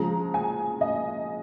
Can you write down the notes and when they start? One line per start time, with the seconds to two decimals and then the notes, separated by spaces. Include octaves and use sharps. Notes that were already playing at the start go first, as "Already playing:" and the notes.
Already playing: C#3 F3 G#3 A#5
0.34 G#5
0.81 D#5